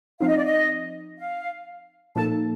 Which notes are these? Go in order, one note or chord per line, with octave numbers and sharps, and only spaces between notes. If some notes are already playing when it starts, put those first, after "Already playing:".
F3 C4 D#4 F5
D#5
D5
D#5
F5
A#2 F3 A#3 D#4 A4 A5